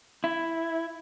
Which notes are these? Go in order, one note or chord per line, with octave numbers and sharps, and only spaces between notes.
E4